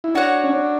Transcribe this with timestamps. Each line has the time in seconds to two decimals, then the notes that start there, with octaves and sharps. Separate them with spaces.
0.04 E4
0.15 D4 F#4 C#5 F#5
0.44 C#4
0.53 D4